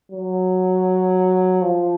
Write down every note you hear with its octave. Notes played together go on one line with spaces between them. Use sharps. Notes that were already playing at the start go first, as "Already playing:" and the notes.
F#3
F3